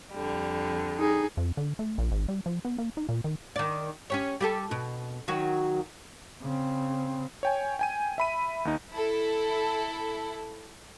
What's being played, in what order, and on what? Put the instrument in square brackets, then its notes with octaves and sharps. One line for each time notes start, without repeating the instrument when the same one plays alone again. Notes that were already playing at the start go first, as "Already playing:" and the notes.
[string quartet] F2 D3 G3
[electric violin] D#4 G#4
[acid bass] F2
D3
A3
A#1
G#1
G3
F3
B3
A#3
D#4
A#2
D#3
[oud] D#3 D5
C#4 G4 C#5
G3 G4 A4
B2
D#3 F#3 F#4
[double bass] C#3 C4
[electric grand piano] C#5 G5 G#5
G5 G#5 D#7
E5 B5 D#7
D#2 D#4
[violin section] E4 A4